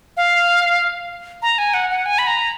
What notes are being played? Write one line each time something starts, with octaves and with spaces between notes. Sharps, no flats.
F5
A#5
G#5
F#5
F#5
G#5
B5
A#5